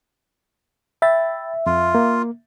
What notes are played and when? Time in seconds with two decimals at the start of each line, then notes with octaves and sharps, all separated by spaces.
1.02 E5 G5 B5 A6
1.66 F2 F4
1.95 A#3